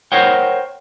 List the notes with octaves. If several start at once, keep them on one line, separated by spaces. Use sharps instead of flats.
A#4 C5 C#5 F#5 G5